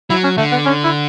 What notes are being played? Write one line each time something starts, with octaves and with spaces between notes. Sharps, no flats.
F#3 E4
C#4
D3 A3
B3
C#4
E4